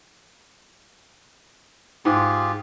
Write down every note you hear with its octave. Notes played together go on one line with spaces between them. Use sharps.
G#2 F4 G4 G#4